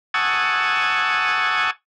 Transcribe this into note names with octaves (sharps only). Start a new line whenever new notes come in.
F#5 G#5 A5 C#6 D#6 E6